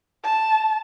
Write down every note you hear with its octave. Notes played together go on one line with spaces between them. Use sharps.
A5